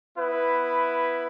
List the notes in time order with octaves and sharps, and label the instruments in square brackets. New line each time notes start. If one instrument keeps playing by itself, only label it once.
[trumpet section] B3 E4 B4